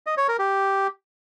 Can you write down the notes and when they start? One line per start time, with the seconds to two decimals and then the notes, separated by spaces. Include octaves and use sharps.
0.06 D#5
0.17 C#5
0.28 A#4
0.39 G4